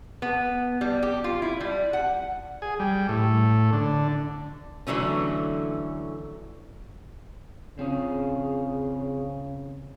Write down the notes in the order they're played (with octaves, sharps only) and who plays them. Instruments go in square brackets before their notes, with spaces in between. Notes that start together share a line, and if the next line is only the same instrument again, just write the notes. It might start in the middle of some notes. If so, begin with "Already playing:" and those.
[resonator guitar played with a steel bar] B3
G3
G4
F4
E4
G3
F#5
[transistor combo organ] G#4
G3
A2
D3
[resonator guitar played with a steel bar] D3 E3 F#3 A3 C#4
[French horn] C#3 [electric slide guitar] C4 F4 G#4